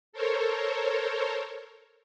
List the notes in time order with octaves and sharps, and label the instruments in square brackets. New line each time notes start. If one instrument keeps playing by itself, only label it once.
[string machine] A4 A#4 C5 C#5